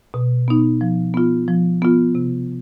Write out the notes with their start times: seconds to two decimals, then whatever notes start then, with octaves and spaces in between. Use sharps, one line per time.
0.14 B2
0.48 B3 D#4
0.81 F3
1.14 B3 F4
1.48 F3
1.82 B3 F4
2.15 C3